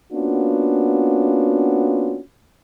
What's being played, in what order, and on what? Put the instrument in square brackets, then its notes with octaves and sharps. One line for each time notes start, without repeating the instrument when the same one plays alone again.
[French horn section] A#3 B3 C#4 D4 F4 F#4